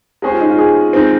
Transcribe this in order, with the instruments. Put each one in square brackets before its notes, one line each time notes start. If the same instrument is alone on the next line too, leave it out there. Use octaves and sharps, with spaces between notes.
[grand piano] G#3 C#4 G#4 C5 [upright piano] G4
[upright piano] F4
D#4
F4
G#4
[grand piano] D#3 G#3 C4